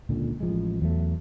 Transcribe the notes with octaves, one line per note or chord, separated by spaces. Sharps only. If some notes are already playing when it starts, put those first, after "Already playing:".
C#2 A#2 D3
A1 F3 G#3
E2 F#3 A3